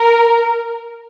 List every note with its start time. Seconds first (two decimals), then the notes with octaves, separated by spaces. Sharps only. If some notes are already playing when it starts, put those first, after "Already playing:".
Already playing: A#4